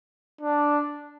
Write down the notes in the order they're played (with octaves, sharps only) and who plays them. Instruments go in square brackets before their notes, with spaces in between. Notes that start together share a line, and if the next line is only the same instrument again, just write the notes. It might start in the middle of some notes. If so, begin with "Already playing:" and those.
[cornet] D4